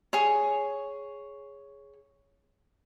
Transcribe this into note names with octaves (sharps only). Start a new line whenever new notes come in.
G#4 C#5